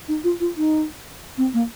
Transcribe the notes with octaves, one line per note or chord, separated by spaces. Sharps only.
D#4
F4
F4
D#4
C4
A#3